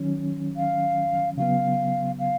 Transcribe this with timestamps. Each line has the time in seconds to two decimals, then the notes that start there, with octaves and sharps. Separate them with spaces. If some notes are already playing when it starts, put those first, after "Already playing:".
Already playing: D#3 F#3 C#4
0.56 F5
1.37 C#3 F#3 B3 F5
2.19 F5